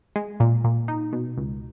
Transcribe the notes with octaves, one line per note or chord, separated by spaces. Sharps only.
G#3
A#2
A#2
D#4
B2
C#2